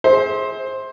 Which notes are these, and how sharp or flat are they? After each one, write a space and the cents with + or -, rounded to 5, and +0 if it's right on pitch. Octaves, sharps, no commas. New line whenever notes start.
G#4 +0 C5 +15 E5 -35